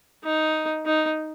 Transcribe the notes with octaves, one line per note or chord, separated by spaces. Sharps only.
D#4
D#4